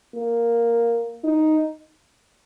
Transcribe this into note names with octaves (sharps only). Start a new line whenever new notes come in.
A#3
D#4